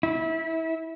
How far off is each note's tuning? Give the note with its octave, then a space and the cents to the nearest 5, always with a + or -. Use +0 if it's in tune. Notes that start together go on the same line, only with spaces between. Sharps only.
E4 -25